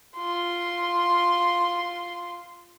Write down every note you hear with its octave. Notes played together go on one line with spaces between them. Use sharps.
F4 C6